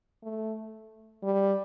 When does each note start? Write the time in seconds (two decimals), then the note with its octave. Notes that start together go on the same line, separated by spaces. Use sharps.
0.23 A3
1.23 G3